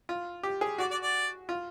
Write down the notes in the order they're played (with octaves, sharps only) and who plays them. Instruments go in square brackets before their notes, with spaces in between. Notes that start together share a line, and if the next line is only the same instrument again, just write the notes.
[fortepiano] F4
G4
G#4
[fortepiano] F#4 [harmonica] D5
[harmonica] D5
D5
[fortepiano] F4